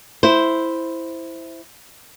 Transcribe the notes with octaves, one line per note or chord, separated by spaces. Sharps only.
E4 C5